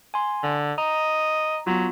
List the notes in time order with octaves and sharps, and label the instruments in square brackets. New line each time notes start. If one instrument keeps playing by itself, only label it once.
[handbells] G#5 C6
[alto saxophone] D3
[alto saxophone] D#5 [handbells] A#5
[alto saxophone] F#3 [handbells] B3 F4